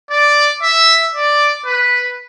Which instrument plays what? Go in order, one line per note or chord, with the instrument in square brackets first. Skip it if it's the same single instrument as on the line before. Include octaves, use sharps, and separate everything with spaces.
[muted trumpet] D5
E5
D5
B4